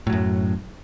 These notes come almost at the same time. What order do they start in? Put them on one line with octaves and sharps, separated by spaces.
A2 F#3 F#2